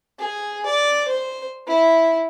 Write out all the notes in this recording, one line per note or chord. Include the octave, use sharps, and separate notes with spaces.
G#4
D5
C5
E4